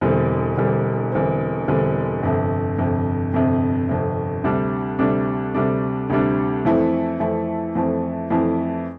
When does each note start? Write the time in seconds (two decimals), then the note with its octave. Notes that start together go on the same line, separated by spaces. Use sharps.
0.01 E1 E2 D3 G3 C4
0.57 E1 E2 D3 G3 C4
1.12 E1 E2 D3 G3 C4
1.68 E1 E2 D3 G3 C4
2.23 G1 F2 C3
2.78 G1 F2 C3
3.33 G1 F2 C3
3.89 G1 F2 C3
4.44 D2 C3 G3 D4
4.99 D2 C3 G3 D4
5.54 D2 C3 G3 D4
6.10 D2 C3 G3 D4
6.65 F2 E3 A3 C4 E4
7.20 F2 E3 A3 C4 E4
7.75 F2 E3 A3 C4 E4
8.30 F2 E3 A3 C4 E4